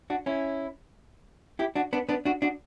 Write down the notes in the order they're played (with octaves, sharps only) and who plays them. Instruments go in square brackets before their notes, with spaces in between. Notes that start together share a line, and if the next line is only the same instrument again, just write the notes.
[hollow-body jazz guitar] D4 F#4
C#4 E4
E4 G4
D4 F#4
B3 D4
B3 D4
D4 F#4
D4 F#4